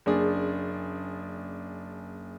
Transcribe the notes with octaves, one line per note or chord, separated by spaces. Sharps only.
F#1 D4 G#4